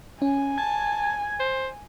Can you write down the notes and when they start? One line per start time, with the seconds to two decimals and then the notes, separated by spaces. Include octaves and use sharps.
0.22 C#4 G#5
0.58 A5 G#6
1.40 C5